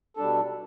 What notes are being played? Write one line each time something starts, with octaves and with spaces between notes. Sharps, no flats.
B2 G3 D4 A4